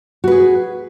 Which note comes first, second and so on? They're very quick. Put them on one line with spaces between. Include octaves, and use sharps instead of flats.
F#4 B4 G#4